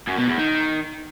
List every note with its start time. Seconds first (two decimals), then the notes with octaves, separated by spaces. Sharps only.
0.08 F#2
0.18 B2
0.29 E2
0.39 D#3